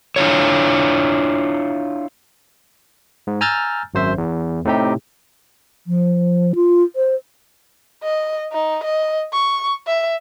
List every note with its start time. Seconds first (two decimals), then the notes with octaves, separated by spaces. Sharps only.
0.16 D4 E4 F4 C#5
3.27 G#2
3.41 G#5 A#5 E6 F6 G6 A6
3.94 G#1 F#2 C5 E5
4.18 E2
4.65 A2 C3 D#4 G4
5.87 F3
6.55 F4
6.96 C5
8.03 D#5
8.52 D#4
8.84 D#5
9.33 C#6
9.87 E5